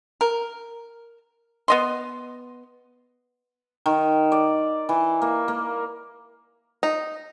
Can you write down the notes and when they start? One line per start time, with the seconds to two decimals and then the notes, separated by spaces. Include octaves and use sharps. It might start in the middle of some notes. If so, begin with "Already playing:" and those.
0.21 A#4
1.68 B3 D#5 C6
3.86 D#3
4.32 D5
4.89 E3
5.22 A#3
5.48 A#3
6.83 D#4